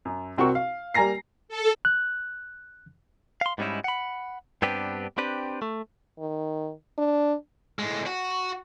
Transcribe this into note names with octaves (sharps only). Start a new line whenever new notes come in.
F#2
C2 C4 F#4 A#4 C#6
F5
G3 A#3 G#5 A#5 A#6 C7
A4
F#6
F5 C6
G#2 G3 B3 C#4 D#4 E4
F#5 B5
G2 B3 C4 D4 G4 B4
C4 D4 G4 B4
A3
D#3
D4
A2 G#3
F#4